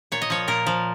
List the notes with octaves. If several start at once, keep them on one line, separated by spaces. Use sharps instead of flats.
A#2 C#5
D#5
F3 C#5
A#2 A#4
F3